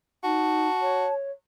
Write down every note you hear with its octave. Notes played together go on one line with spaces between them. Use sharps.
D#4 F#4 A5
C#5